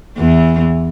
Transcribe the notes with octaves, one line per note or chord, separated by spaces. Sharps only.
E2 E3